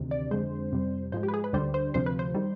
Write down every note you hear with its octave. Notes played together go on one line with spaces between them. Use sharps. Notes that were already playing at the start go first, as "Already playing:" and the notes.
Already playing: D2 C3 D#3
D5
F2 D3 G#3 C5
F2 C3 G3
G#2 F3 G#3 C5
G4
B4
G#4
B4
D2 D3 G3 C5
C5
D2 C3 F3 C5
B4
C5
D#3 G3